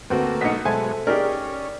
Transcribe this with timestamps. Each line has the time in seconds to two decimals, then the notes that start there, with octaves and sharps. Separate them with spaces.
0.10 D2 A3 A#3 C4 F#4 B4
0.41 B1 D#4 B6 C#7
0.65 B2 F#3 G#3 A4 C5 E5 G#5 A5
1.07 C#4 D#4 G4 G#4 A#4 D5